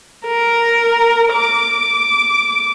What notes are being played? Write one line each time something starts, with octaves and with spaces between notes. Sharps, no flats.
A#4
D6